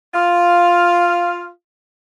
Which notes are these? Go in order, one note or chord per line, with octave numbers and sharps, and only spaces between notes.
F4 F5